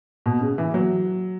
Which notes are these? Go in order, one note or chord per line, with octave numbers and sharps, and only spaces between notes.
B2
C#3
E3
F#3